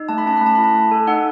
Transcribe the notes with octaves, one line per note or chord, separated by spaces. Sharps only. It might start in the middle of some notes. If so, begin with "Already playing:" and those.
Already playing: D#4
A3 A5
B5
C#4 A5
B5
A3 A5
E4 B5
A5
A3
A4 G#5
D#4 F#5